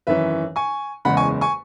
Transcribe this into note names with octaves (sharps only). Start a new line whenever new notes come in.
G#1 F#2 E3 C#4 B4 E5
G#5 C#6
F#1 E2 C#3 G#3 F#5 B5
G#5 C#6
G#5 C#6